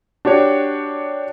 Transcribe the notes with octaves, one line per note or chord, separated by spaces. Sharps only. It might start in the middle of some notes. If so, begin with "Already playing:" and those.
D4 F#4 G4 C#5